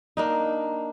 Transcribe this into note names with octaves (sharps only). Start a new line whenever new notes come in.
A#3 D4 D#4